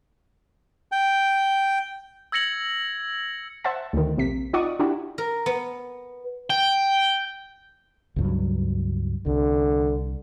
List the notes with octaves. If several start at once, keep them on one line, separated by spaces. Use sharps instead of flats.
G5
E6 G#6 A#6 C#7 F#7
C5 E5 F#5 A5
D2 D#3
A#1 C3 B6
D#4 F4 D5 F#5 C#6 D#6
D4 E4 F#4 G4
A#4
B3
G5
C#2 G2 F#3
C2 D3